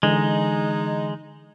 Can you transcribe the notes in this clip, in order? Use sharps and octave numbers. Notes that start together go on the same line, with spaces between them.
D3 E3 G#3 D#4